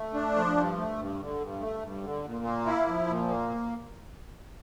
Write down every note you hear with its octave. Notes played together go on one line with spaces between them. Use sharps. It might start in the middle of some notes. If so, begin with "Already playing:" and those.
Already playing: A3
D4
F3
G2
A3
G2
D3
G2
A3
G2
D3
A#2
A#3
E4
F3
A#2
A#3